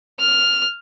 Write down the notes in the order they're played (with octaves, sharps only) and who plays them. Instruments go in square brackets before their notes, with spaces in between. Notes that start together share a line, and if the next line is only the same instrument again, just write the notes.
[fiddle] F6